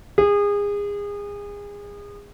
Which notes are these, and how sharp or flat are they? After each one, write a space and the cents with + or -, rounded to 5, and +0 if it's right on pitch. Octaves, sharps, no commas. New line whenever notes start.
G#4 -30